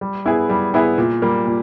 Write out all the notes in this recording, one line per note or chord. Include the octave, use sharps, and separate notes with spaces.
G3
B3 E4 G#4
G3
B3 E4 G#4
A#2
G3 A#3
A#2